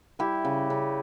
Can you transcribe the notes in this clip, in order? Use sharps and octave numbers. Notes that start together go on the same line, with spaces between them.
G3 E4 G4
C#3
C#3